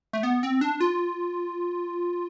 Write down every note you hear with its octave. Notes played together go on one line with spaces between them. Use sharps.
A3
B3
C4
D4
F4